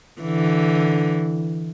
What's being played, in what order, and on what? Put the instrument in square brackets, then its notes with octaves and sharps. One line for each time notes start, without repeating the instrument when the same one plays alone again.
[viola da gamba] D3 E3